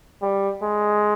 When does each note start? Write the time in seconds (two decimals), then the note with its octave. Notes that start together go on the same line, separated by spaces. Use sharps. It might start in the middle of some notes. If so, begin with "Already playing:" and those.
0.22 G3
0.63 G#3